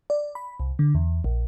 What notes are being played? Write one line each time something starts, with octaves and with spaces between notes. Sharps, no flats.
D5
B5
C2
D3
E2
A#1